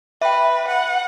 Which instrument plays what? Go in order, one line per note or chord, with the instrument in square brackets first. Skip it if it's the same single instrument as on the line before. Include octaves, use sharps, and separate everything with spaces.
[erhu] B4 [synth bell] E5 G5
[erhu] F#5